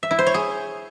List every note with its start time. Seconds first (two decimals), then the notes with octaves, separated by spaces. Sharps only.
0.03 E5
0.11 E4
0.19 C5
0.26 C#5
0.34 G#4